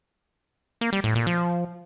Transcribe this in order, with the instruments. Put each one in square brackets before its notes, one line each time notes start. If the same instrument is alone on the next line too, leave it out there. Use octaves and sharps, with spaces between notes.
[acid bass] A#3
G3
A2
A#2
F3